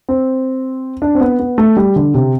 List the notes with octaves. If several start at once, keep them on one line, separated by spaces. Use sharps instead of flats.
C4
D4
C4
B3
B3
A3
G3
D3
C3